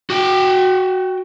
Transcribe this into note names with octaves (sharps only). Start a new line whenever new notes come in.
F#4 G5